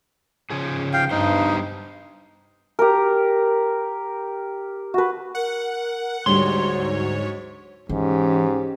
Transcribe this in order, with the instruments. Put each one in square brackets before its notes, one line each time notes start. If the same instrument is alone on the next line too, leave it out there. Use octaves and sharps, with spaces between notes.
[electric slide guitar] C#3 F3 G#4
[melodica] F5 G5
[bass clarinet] G2 [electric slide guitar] G3 B3 C5 [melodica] D#4
[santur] G4 A#4
F#4 B4
[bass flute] A#4 [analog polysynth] F#5
[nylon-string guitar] D2 G3 D4 [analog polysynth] G#2 C#5 [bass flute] F#3 [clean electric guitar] C6
[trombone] G#2 [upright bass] E3 [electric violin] C#4 G4